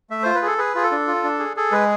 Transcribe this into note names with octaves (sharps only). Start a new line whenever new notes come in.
A3 E5
F4 C5
B4
G#4
A4
G#4 B4
F4 G#4
A4
D4
F4
D4
G#4
G#4 A4
G#3 B4